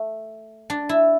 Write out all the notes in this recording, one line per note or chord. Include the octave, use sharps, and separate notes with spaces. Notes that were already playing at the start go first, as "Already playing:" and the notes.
Already playing: A3
D4
E4